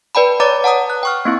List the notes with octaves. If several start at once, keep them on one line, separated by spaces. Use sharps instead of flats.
B4 D5 G5 A5 B5
B4 C#5 D5 A#5 D6 A6
F#5 A5 A#5 D#6
F#6
G5 C#6 F6
A#3 C4 E4